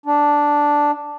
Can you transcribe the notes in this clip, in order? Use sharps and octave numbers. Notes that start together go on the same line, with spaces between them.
D4